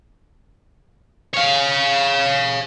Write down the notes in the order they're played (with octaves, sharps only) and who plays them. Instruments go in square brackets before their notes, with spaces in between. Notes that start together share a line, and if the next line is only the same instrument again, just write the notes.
[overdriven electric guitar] C#5 F5